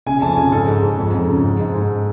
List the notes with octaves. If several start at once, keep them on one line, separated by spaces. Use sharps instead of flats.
C#3 G#5
F2 A5
C#3 G#5
G#2 A4
G#2
G#2
F2
F2
C#3
G#2
G#2
G#2